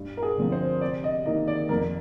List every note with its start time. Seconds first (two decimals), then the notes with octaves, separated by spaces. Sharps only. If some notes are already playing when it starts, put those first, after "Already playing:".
Already playing: G2
0.17 A#4
0.22 G#4
0.37 D3 F3 C4
0.52 C5
0.81 C3 D5
1.04 D#5
1.26 D#3 A#3 D#4 D#5
1.48 D5
1.69 F2 A#4